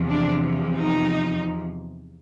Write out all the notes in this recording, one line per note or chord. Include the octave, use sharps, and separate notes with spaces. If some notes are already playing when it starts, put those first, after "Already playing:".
Already playing: E2 C3 F3
D4
D#4